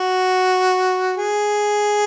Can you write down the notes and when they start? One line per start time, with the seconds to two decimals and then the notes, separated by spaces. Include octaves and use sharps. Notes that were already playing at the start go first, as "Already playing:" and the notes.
Already playing: F#4
1.17 G#4